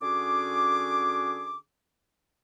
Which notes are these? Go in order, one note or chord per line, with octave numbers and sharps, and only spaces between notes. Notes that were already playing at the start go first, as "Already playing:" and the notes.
D3 C#4 F#4 G#4 D6